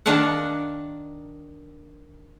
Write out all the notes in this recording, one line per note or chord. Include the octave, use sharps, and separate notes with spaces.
D#3 D4 A#4 F5 F#5